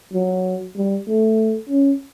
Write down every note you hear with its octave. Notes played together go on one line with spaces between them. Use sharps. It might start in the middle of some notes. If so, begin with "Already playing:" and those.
F#3
G3
A3
C#4